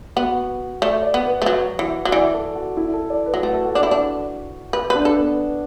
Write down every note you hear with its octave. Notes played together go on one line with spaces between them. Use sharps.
B3 F#4
A3 D5
D5
B3
B4
A3
F#3 F#4
E3
F#3
E3 D5
A4
F#4
E4
A4
D5
B4
F#3
A3 F#4
A4
F#4
D4
E4
D4
B4
D4 B4
A4
B3